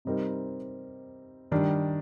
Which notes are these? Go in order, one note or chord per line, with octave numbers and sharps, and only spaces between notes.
C3 G3 C4 D#4 A#4
D#3 G3 D4